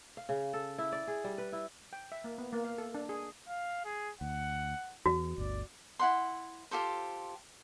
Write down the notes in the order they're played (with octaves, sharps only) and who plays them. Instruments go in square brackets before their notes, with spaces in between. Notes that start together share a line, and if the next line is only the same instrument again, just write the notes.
[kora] F5
C#3
A4
E4
D5
G#4
G3
B4
E4
[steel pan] G5
E5
A#3
B3
A#3
F5
A4
D4
G#4
[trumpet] F5
G#4
[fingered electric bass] D2 [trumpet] F#5
[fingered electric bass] E2 [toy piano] F#4
[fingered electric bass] G1 D2 [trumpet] D5
[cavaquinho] E4 F#5 C6
F4 G4 A4 C5